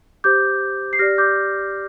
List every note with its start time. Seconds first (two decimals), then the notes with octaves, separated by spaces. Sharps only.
0.24 G4 C5 D6 G6
0.93 C7
0.99 G4 D5 F6 A#6
1.18 D6 G6